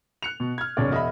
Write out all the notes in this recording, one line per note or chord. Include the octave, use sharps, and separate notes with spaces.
F#6 C#7 F7
B2
F6 G#6
F#1 B1 C#3 C#5 D5
E1 D#5 E5 B5